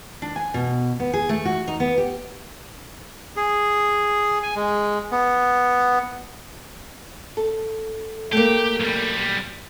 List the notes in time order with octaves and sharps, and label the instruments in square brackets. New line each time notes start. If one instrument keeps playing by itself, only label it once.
[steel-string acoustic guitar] D4
G#5
B2
B3
G#4
A3
F#4
D#4
B3
G4
[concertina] G#4
G#5
G#3
B3
[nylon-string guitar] A4
[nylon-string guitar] A3 A#3 [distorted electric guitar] G4
[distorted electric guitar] B1 G3